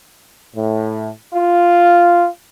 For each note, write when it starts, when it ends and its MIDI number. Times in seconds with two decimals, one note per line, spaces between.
0.56 1.10 45
1.34 2.27 65